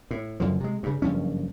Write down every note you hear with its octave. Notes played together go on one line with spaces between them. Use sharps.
A2
F#1 F#2 D3 F3
C3 G#3
G2 C#3
F#1 G2 F3 C#4